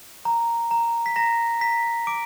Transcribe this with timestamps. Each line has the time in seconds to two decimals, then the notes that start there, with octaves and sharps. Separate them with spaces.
0.25 A#5
0.71 A#5
1.06 B6
1.16 A#5 A#6
1.61 A#5 B6
2.07 D6 D7